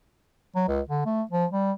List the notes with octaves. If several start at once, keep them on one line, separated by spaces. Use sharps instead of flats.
F#3
C#2
D3
A3
F3
G3